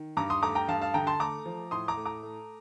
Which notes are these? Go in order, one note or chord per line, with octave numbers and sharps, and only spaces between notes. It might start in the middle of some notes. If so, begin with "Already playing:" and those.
Already playing: D#3
G2 A#5 D6
C6 D#6
A3 A#5 D6
G5 A#5
G2 F5 A5
F5 A5
D3 G5 A#5
A5 C6
A3 A#5 D6
F3
A2 C6 D#6
A#5 D6
A3
A#5 D6
A3